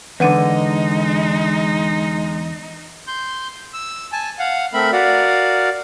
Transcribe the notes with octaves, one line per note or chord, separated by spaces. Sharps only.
E2 D3 G#3 D#4 B4 F#5 D#7
C6 G6
E6
G#5 A5
F5 F#5
A3 C4 A#4 E5 B5
F#4 A#4 D5 F5 F#5